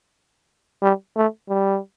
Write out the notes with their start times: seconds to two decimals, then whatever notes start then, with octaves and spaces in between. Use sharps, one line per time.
0.82 G3
1.16 A3
1.49 G3